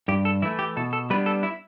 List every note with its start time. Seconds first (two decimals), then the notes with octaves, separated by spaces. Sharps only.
0.08 G2 G4
0.25 A4
0.42 E3 E4
0.45 A3
0.59 G4
0.77 B2 A4
0.93 A4
1.10 G3 B3 D4 B4
1.26 A4
1.43 E4